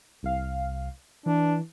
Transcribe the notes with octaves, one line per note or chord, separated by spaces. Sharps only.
C2 F5
E3 D4